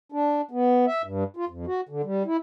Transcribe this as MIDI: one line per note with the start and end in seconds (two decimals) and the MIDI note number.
0.12 0.41 62
0.51 0.85 59
0.87 1.02 76
1.04 1.24 43
1.36 1.45 65
1.49 1.66 41
1.67 1.81 66
1.89 2.02 50
2.04 2.23 55
2.26 2.37 64